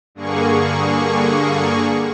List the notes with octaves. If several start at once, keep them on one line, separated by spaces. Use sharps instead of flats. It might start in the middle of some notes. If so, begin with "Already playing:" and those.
G2 D3 A#3 G#4 C#6